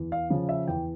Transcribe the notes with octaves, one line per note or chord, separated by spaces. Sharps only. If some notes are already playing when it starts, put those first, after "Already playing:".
Already playing: E2
F5
C#3 F3
E5
E2 G5